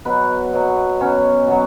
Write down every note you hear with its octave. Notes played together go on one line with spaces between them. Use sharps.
B2 F#3 B4
B2 F#3
B2 F#3 C#4
B2 F#3